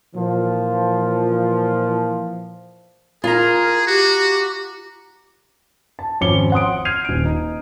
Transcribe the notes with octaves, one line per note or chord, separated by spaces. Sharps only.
A#2 E3 F3
F4 G#4 A#4 A#5
F#4 G4
A5
G#1 F2 C#4 D6 C#7 G7
F#5 C6 D#6 D7
F6 G6 G#6 C7 D#7 F7
D#1 D7
D#4